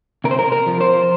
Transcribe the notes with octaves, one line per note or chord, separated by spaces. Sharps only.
C3 A#4
C5
A#4
A#4
F3
C5